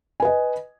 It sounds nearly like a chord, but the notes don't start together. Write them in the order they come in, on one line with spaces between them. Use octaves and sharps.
G#5 B4 D#5